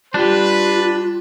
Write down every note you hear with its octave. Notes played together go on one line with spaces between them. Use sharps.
G3 D4 F4 G4 B4